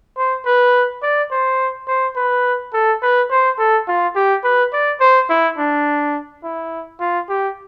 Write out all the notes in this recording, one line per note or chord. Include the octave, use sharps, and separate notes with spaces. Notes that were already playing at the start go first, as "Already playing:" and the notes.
C5
B4
D5
C5
C5
B4
A4
B4
C5
A4
F4
G4
B4
D5
C5
E4
D4
E4
F4
G4